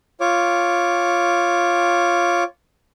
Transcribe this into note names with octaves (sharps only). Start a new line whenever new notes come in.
F4 C#5 D6